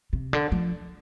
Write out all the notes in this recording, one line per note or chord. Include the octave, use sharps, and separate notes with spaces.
C3
D3
F3